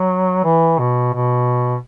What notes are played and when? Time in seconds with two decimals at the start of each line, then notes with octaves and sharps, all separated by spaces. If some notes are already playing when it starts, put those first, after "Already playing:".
Already playing: F#3
0.44 E3
0.79 B2
1.13 B2